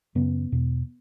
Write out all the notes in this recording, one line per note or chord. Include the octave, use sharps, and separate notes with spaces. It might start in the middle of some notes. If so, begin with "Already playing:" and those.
F#2 C#3 B3
E2 B2